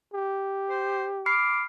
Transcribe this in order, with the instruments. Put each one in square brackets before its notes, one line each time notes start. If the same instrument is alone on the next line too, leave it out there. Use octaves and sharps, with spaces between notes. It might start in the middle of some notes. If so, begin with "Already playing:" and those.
[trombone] G4
[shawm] C5
[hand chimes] B5 F6 C7 [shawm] D6